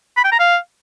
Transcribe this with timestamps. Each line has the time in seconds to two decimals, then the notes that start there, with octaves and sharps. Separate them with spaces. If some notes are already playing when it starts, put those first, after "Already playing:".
0.17 B5
0.24 G5
0.32 A#5
0.40 F5